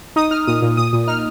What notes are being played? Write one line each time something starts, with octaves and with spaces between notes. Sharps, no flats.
D#4 D#6
D#4 F6
A#2 D#6
A#2
A#2 D#6
A#2
D#4 F6